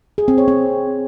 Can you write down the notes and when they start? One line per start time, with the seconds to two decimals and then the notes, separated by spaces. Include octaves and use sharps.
0.18 G#4
0.28 C4
0.38 C#5
0.48 C4